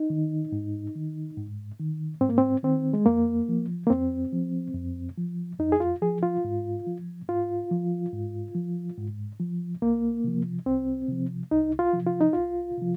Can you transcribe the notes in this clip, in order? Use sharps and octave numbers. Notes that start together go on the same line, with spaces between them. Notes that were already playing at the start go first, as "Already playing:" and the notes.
Already playing: D#4
D#3
G#2
D#3
G#2
D#3
G#2 C4
A#3
C4
D#3 C4
G#3
F2 A#3
F3
A#3
F2 C4
F3
F2
F3
F2 D#4
G#4
F4
F3 G#4
F4
G#2
F3
G#2 F4
F3
G#2
F3
G#2
F3
C2 A#3
C3 F3
C2 C4
C3 F3
C2 D#4
F4
C3 F3
F4
D#4
C2 F4
C3 F3